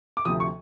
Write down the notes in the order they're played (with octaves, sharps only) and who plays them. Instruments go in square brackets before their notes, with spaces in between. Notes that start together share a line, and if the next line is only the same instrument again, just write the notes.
[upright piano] D6
D2 C3 F3 D#6
C#6